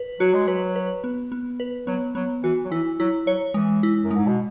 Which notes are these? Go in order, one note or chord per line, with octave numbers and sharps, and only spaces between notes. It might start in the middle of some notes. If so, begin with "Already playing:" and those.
Already playing: B4
F#3 F#4
G#3
F#3 B4
B4
B3
B3
B4
F#3 B3
F#3 B3
E3 F#4
F#3
E3 E4
F#3 E4
F#3 C#5
E3 G#3
E4
F#2
G#2 G#3
B2